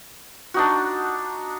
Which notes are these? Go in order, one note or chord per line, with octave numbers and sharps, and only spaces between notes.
D4 D#4 F#4